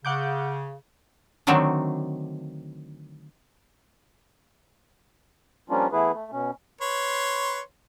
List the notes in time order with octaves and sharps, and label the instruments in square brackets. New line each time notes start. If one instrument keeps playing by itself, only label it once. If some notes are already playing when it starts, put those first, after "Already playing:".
[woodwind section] C#3 [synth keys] F#5 D6 G6
[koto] D3 D#3 F#3 A3 C4 D4
[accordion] F3 G3 A#3 C#4 D4 F4
E3 A3 B3 E4 G#4 B4
A3
B2 C#4
[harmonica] B4 C#5 C6